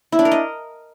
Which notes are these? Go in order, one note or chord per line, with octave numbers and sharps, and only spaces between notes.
E4
D4
A#4
D#5